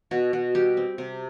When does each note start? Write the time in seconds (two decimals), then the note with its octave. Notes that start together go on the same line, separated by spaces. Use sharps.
0.11 B2 F#4
0.33 B2 F#4
0.55 G3 G4
0.77 C4
0.98 C3